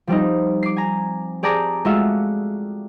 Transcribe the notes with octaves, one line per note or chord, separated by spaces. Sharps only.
F3 G3 C4 D#4
D6 C7
G#5 A#5
G4 G#4 D5 A5 A#5 D6
G#3 A3 F4 F#4 E5 F5